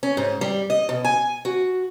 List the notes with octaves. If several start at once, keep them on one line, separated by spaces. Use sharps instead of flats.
C#4
G#2
G3
D#5
B2
G#5
F#4